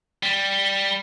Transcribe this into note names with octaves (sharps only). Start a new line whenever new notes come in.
G3